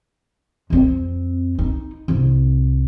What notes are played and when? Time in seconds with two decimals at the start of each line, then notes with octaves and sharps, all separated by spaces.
0.70 F2 C4
1.59 D#4
2.08 C2 C3